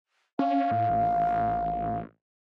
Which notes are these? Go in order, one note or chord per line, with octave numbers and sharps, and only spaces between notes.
C#4 F5
A2
A1